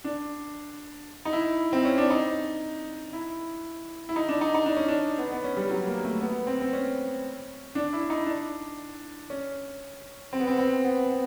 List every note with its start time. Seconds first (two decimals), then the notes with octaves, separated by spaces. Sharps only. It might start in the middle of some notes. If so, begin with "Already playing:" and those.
0.04 D4
1.25 D#4
1.33 E4
1.73 C4
1.85 C#4
1.98 D4
2.10 D#4
3.13 E4
4.09 E4
4.16 D#4
4.29 D4
4.41 D#4
4.54 D#4
4.66 D4
4.77 C#4
4.88 D4
5.18 B3
5.32 B3
5.44 C#4
5.57 G3
5.70 F#3
5.87 A#3
6.04 A3
6.21 B3
6.47 C4
6.61 C4
6.73 C#4
7.75 D4
7.93 E4
8.10 D#4
8.26 D4
9.30 C#4
10.33 C4
10.40 B3
10.47 C4
10.59 C4
10.84 B3
11.10 B3